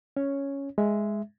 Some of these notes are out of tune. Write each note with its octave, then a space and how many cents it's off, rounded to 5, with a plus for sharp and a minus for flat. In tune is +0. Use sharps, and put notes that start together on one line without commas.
C#4 +0 C#5 +0
G#3 +0 E5 +0